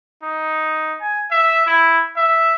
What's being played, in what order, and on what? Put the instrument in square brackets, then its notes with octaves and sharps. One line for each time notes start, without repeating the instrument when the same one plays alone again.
[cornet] D#4
G#5
E5
E4
E5